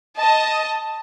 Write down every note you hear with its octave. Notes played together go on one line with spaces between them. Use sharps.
D#5 A5